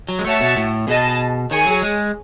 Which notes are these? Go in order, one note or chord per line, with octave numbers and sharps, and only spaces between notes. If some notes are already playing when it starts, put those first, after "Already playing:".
F#3
G#3
A3 F#4 C#5 E5 A5
B2
A2
B2 G#4 D#5 A5
D#3 G#4 C#5 G#5
F#3
G#3